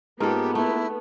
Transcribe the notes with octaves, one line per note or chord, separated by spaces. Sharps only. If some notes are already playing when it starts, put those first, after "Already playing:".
G#2 A#3 B3 F4 G4 A4 A#4
A3 E4